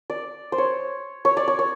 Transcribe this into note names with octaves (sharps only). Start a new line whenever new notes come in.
D5
C5
C#5
C#5
D5
C#5
C#5